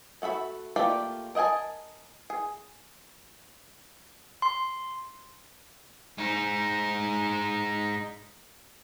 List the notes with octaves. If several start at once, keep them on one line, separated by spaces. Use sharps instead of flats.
A3 F#4 E5 B5
A3 A#3 F4 G4 D5
A#4 D#5 F#5 G#5 A5
G#4
C6
G#3 D#4